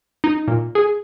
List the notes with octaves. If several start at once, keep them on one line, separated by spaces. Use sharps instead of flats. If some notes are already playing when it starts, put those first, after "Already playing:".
D#4
A#2
G#4